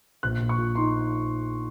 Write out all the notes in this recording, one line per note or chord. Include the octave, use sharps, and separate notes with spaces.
A#1 F#6
A#2
C#6
A#2
D#4 C6